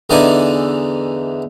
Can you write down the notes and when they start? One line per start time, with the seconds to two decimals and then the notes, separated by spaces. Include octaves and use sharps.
0.10 E2 D3 E3 D#4 D5 G#5